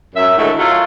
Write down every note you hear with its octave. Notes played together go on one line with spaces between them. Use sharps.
F#2 E5
A2 D3 D#3 F#3 G#3 A3
F#3 A3 F4